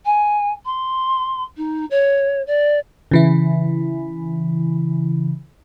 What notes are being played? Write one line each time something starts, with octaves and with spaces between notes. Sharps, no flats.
G#5
C6
D#4
C#5
D5
C#3 E3 E4